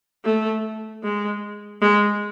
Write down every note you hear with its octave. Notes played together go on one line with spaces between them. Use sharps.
A3
G#3
G#3